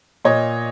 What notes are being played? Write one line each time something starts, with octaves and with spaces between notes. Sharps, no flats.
A#2 C#5 D#5